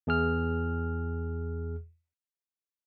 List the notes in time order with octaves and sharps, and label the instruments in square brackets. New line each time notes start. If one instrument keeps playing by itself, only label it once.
[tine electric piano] E2 G#4 F6